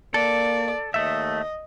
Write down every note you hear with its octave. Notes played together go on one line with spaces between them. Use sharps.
A#3 A4 D5
D#2 A3 D#5 E5